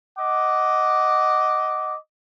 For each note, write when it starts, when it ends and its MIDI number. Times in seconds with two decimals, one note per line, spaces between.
0.19 1.96 75
0.19 1.96 78
0.19 1.96 86